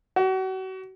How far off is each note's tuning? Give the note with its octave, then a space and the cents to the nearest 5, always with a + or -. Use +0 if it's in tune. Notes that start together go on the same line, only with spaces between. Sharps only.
F#4 +35